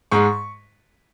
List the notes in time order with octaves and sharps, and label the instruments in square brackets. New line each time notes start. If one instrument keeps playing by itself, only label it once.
[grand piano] G#2 G#3 C#6